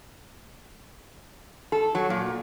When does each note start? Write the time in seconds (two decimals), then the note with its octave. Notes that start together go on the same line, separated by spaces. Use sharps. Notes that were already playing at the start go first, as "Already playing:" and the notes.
1.72 A4
1.95 F#3
2.10 A#2